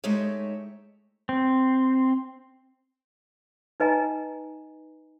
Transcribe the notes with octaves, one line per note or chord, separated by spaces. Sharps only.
G#3 A3 D#4 G4 C#5 E5
C4
D#4 B4 D#5 G#5 A#5